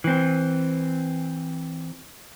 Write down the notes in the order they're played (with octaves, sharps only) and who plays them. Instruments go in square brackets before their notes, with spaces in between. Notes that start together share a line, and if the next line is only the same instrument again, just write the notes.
[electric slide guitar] E3 C4